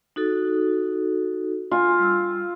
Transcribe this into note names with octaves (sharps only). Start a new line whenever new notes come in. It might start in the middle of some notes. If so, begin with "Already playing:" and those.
D#4 F#4 A4
F4 G#5
G3 E6